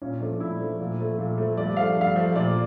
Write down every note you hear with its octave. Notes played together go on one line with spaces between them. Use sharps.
A#2 C#4
F3 A3 D4
A#2 E4
F3 A3
A#2
F3 A3
A#2
F3 A3
G2 D5
F3 A3 F5
G2 F5
F3 A3
A#2 D5